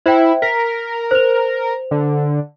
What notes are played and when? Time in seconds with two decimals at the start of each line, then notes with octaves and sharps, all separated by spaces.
0.06 E4 C5 E5 G5
0.42 A#4 B6
1.11 C5 F7
1.91 D3